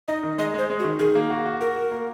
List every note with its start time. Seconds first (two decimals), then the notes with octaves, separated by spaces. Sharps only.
0.08 D#4 D#5
0.23 D#3
0.38 G#3 D#5
0.54 G#3 C5
0.70 G#3
0.79 F#4
0.84 D#3
0.99 D#3 G#4
1.15 A#3
1.30 F#4
1.46 F#4
1.60 F#4 A#4
1.76 F#4
1.91 A#3